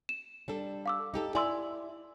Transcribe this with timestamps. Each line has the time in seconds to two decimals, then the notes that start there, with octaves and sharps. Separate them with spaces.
0.09 E7
0.48 G3 D4 A4
0.86 F5 D6 E6
1.14 D#4 G4 A4
1.35 E4 D5 G#5 C6 E6